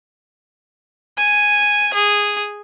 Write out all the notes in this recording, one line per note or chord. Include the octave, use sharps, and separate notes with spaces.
G#5
G#4